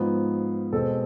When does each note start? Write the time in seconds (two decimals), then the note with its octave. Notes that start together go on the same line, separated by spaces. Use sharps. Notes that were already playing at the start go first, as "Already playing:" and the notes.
Already playing: G#2 F3 B3
0.72 B2 G#3 C4 A4